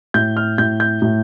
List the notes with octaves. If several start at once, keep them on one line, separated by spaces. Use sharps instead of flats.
A2 G6
F6
A2 G6
G6
A2